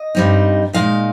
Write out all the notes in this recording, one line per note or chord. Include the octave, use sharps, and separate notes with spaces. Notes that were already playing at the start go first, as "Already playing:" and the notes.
Already playing: D#5
G2 G3 C4 D#4
A#2 G#3 D#4 F5